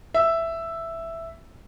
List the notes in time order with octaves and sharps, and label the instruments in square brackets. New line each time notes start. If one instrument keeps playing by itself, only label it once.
[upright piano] E5